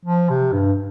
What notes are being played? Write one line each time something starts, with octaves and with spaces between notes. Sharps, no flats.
F3
C3
G2